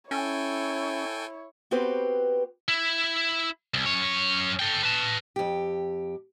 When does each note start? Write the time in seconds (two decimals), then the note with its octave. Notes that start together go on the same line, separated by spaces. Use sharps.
0.11 C#4 E4 A4 C#5 G5 G#5
1.71 B3 C4 F#4 G4 B4 C5
2.68 E4
3.74 C2
3.86 F#2 C#5
4.59 A4 G5
4.84 B4 A5
5.36 F2 G4